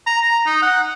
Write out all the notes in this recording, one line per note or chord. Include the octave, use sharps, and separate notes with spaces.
A#5
A#5
D#4
F#5